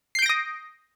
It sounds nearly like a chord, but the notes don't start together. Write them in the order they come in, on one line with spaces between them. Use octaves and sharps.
C7 G6 D7 A#6 D#6